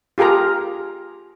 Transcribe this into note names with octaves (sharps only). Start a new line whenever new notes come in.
F4 G4 G#4 A#4 A#5